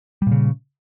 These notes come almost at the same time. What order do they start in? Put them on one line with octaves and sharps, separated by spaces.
G3 A#2 C#3